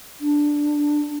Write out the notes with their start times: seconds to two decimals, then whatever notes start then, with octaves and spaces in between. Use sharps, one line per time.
0.21 D4